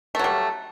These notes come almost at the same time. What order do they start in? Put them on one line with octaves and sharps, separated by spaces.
A3 F#3 G3